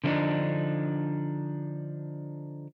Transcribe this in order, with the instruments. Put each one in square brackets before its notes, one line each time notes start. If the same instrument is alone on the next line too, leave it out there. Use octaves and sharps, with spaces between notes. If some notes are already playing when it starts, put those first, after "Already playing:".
[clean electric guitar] D3 F3 G#3 C4 D4 D#4